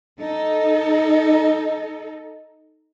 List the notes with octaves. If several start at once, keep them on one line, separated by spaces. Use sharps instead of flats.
D#4 A4